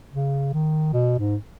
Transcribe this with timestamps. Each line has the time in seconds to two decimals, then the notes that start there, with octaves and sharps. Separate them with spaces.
0.13 C#3
0.53 D#3
0.93 B2
1.19 G#2